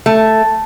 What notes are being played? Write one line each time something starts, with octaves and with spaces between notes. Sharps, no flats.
A3